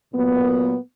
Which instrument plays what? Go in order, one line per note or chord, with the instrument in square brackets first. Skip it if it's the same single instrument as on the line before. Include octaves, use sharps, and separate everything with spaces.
[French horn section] A#2 F#3 A#3 B3